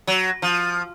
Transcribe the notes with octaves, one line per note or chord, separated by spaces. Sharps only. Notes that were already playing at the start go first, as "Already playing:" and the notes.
F#3
F3